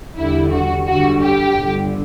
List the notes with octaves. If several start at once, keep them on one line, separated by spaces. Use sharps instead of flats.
E2 D3 G3 E4
F#4
F#2 D3 G3 F#4
G4
G1 G2 D3